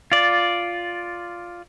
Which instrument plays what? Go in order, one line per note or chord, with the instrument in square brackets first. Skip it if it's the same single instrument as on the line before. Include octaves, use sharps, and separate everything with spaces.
[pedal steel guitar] F4 D5